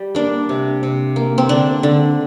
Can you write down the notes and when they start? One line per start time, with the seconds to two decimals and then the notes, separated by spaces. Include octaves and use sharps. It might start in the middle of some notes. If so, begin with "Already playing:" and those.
Already playing: G3
0.15 A#3 D4
0.49 C3
0.83 C3
1.16 A#3
1.38 C4
1.49 D3 D4
1.83 D3